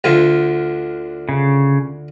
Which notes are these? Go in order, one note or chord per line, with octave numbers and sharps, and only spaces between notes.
D2 D3 F4
C#3